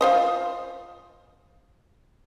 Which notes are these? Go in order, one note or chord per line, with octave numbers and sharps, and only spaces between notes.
F4 C5 D#5